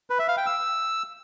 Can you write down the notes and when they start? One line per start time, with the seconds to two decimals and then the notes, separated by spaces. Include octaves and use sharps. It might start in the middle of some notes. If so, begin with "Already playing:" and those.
0.10 B4
0.19 E5
0.28 F5
0.37 G5
0.46 E6